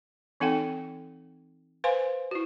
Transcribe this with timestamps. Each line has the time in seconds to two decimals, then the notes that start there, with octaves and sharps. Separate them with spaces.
0.40 E3 C4 D#4 A4 F#5 G5
1.84 B4 C5 F5 G#5 C6
2.31 E4 F#4